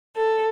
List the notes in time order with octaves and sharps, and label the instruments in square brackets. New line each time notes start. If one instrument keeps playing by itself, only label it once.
[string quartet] A4